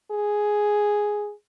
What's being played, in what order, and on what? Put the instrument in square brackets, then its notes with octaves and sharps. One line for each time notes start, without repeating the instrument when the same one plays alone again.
[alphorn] G#4